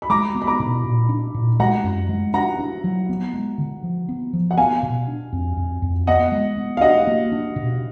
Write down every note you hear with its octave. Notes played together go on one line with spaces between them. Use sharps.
B5
G#3 A#5 D6
B3
B5
A#5 D6
B2
A#2
D4
A#2
G#3 F#5 A#5
F#2
G#3
D4 F#5 A#5
D4
F#3
B3
G#3
D3
F3
B3
F3
F#5
B3 F5 G#5
B2
D4
F2
F2
F2
B3 D#5 F#5
G#3
B3
F5
D4 D#5 F#5
A#3
D4
B2